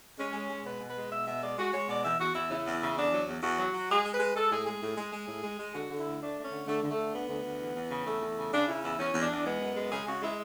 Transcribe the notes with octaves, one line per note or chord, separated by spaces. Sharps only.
G#3 C#4
G#3
G#3
B2 B4
B2
B4
G#3
B2 E5
B2 E5
G#3 D5
G#3 F#4
G#3 C#5
B2 D5
E2 E5
E2 F#4
E2 E4
C#3 E4
E2
C#3
E2 D4
F#3
E2
E2 F#4
F#3
F#3
G#3 G#4
G#3
B4
G#3
G#3 A4
A2 G#4
G#3 G#4
A2
G#3
G#3
A2
G#3
G#3
D3 F#4
D3
E4
D2
A3 D4
A3
C#4
D3
D3 A3
D3
A3
D3
D2 B3
D2
D2
E2
E2
C#3
E2 A3
E2
C#3
C#3 D4
C#3 E4
E2 E4
E2 C#4
E2
D4
E2
G#3 B3
F#2
G#3
C#3 G#4
C#3 F#4
G#3 E4